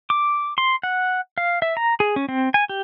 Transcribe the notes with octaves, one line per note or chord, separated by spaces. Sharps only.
D6
C6
F#5
F5
E5
A#5
G#4
C#4
C4
G#5
G4